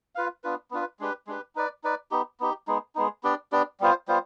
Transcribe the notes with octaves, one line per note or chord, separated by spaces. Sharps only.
F4 B4 F5
B3 D4 F4 B4
B3 D4 F4 B4
G#3 D4 G4 B4
G#3 D4 G4 B4
D#4 B4 D5
D#4 B4 D5
B3 D#4 G4
B3 D#4 G4
G#3 B3 D#4
G#3 B3 D#4
B3 D4 G4 D5
B3 D4 G4 D5
G3 B3 F4 C5
G3 B3 F4 C5